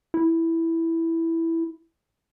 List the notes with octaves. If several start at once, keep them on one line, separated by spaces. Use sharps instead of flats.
E4